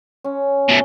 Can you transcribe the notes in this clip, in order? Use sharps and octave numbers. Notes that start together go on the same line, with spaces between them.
C#4
B2 A3